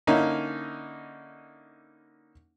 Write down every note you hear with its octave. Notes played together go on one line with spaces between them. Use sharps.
D3 A#3 C#4 D#4 E4